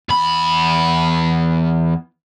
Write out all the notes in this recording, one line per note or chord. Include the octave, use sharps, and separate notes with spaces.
E2 B5